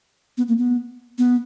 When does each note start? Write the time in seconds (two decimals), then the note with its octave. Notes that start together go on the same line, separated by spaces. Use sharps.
0.38 B3
0.48 A#3
0.58 B3
1.18 B3